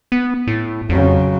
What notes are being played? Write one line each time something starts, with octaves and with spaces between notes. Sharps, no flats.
B3
A2
F2 C#3 F#3